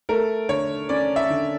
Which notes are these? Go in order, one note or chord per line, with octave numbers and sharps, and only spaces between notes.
A3 A#4
D3 C#5
C#4 D5
E5
D3